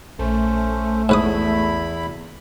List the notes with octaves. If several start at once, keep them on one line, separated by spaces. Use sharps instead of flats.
A#1 A3 C#4 C5
E2 G#2 E4 B4 B5 D#6